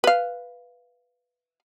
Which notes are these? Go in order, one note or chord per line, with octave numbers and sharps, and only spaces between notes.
B4 F5